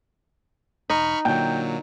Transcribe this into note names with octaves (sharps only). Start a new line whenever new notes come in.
E1 D#4 B5 C#6 F6
A#2 D3 F#3 A#3 G5